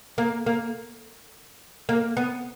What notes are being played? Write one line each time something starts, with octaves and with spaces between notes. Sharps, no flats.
A#3
A#3
A#3
B3